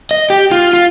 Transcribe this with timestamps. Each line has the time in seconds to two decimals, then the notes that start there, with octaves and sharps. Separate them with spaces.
0.11 D#5
0.30 G4
0.52 F4
0.73 F4